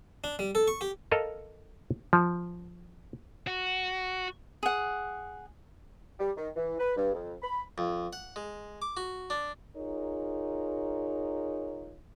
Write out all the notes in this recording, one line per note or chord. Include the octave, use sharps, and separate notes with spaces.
D4
G3
A4
C#6
G4
A4 A#4 D#5 F5
F3
F#4
G#4 F#5
G3
D#3
E3
B4
G2
F2
B5
F2
F#5
G#3
D6
F#4
D4
D#4 F4 G#4 A#4 C#5